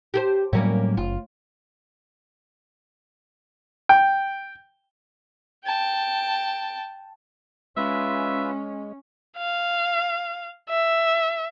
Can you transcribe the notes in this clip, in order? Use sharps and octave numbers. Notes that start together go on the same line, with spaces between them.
G4 G#4 C5
D2 A2 F#3 G3 A#3 C#4
F#1 F4
G5
G5 A5
G#3 C#4 F4 B4 E5
F5
E5